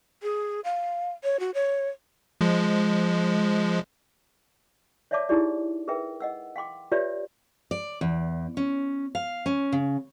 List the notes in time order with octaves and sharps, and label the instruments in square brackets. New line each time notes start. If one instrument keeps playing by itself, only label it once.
[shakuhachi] G#4
F5
C#5
F#4
C#5
[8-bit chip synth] F3 G#3
[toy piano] C#5 D5 E5 F5 A5 D6
D#4 E4 G4 G#4 D5
G#4 A#4 B4 E5 G5
D#5 F#5 E6
F5 G5 C6 D6
F4 G4 B4 C#5 D5 E5
[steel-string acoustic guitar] D5
E2
C#4
F5
C#4
C#3